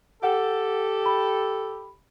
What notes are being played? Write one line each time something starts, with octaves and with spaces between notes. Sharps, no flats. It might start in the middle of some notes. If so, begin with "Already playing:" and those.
G4 A4 F#5
B5